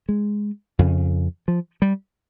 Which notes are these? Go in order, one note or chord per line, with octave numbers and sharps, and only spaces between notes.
G#3
F2 C#3
F3
G3